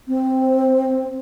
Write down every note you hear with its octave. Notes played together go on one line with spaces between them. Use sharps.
C4